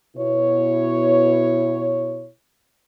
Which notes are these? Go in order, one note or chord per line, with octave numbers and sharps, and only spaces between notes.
B2 E4 C#5